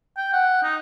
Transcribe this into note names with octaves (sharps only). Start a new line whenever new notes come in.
G5
F#5
D#4